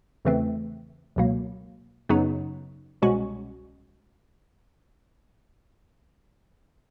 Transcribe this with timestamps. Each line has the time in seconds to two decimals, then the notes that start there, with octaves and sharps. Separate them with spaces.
0.25 E2 C#3 E3 A3 C4
1.16 C#2 B2 F#3 A#3
2.09 F#2 C#3 F#3 B3 D#4
3.02 C2 B2 G#3 C#4 F#4